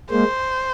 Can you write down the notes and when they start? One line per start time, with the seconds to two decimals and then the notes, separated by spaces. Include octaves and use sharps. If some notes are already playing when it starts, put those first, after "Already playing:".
0.10 G#3 A#3 C5